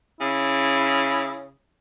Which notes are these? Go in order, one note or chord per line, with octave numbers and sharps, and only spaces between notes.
C#3 E4